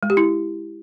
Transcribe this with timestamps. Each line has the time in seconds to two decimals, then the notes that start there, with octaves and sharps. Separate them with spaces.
0.03 G#3
0.10 G4
0.17 E4